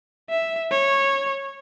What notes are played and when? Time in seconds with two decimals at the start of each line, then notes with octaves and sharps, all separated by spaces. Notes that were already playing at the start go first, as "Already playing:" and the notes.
0.30 E5
0.71 C#5